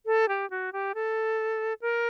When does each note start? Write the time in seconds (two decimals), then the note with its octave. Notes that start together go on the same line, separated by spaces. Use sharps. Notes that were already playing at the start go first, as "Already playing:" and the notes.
0.06 A4
0.29 G4
0.50 F#4
0.73 G4
0.94 A4
1.82 A#4